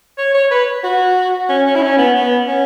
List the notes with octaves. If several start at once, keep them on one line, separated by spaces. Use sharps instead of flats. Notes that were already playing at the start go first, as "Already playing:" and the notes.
C#5
C#5
B4
F#4
C#4
C#4
E4
C#4
B3
B3
C#4